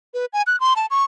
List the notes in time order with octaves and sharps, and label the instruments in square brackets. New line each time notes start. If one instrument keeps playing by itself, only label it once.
[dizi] B4
G#5
F#6
C6
A5
C#6